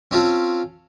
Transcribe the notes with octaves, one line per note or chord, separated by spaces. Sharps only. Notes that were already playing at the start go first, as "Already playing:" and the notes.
C4 C#4 F4 A4